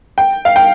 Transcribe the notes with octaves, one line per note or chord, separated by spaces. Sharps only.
G5
F5
G5